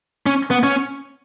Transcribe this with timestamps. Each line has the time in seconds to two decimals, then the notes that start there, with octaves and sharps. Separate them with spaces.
0.26 C#4
0.50 B3
0.63 C#4